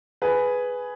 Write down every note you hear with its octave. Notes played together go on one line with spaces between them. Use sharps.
G#4 B4